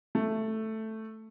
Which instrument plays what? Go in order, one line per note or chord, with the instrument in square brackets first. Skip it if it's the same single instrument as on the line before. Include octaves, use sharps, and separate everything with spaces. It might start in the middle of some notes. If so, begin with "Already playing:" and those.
[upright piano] A3